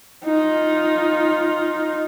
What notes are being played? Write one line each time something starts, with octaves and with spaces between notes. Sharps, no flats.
D#4 F4